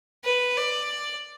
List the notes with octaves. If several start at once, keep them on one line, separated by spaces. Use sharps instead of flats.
B4
D5